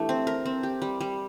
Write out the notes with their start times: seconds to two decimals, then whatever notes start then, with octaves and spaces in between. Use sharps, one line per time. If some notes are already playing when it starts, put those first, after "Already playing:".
Already playing: E3 A3 D4 G4
0.09 C4
0.27 A#4
0.46 C4
0.63 G4
0.82 G3
1.01 G3